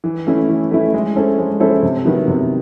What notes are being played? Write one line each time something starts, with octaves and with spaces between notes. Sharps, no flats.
E3
A3 C#4 E4
E3
A3 C#4 E4
G#3
C#4 E4 A4 C5
G#3
C#4 E4 A4 C5
C3
D#3 F#3 B3 E4
C3